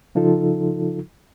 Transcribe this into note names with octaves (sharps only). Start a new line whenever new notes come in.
C#3 F3 D#4 F4 A4